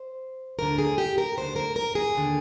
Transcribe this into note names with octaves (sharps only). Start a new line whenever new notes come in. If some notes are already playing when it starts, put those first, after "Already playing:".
Already playing: C5
D2 D3 A#4
G#4
G4
A#4
D2 D3 C5
A#4
A#4
G#4
D#2 D3